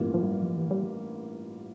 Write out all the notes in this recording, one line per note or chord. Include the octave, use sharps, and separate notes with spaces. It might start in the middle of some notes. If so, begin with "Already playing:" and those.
Already playing: A1 G2 E3 A#3 F4
F3
G3
F3
E3
G3